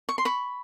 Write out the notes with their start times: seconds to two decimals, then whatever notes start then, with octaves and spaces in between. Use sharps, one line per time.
0.09 C#6
0.18 C6
0.25 B5 C#6